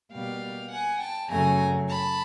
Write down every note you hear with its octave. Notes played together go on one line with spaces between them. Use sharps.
B2 G3 A#3 F5 G5
F#5 G#5
G5 A5
F#2 C#3 F#3 A3 G#5 A#5
A5 B5